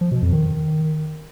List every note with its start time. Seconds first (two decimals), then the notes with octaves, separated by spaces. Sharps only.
0.01 F3
0.11 B2
0.22 F2
0.33 D#3